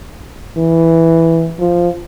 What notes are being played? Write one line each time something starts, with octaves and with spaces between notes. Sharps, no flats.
E3
F3